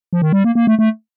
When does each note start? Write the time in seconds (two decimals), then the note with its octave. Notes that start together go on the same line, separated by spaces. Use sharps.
0.13 F3
0.22 D#3
0.33 G3
0.44 A#3
0.55 A#3
0.67 A3
0.79 A3